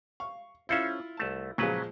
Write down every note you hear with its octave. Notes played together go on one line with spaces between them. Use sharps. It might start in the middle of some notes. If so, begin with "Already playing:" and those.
F5 C#6
C#4 E4 F4 A4 C5 E5
C2 A3 A5
A#2 C#3 F3 F#3 G#3 B4